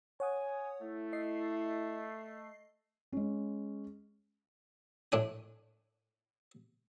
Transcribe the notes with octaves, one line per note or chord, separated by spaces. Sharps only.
C#5 F#5 G#5 D#6
A3 E4
D#5 C7
G#3 C#4
A2 D4 G#5